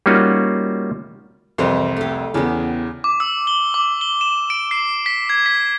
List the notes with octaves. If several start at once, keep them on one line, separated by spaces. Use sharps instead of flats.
G3 A#3 C#4 D#4 F4 F#4
C2 F2 E3 G4 C5 C6
A3 G4
E2 C#3 E3 B3 G4
D6
E6
G7
D6
G7
E7
D7
C7
B6
G#6
B6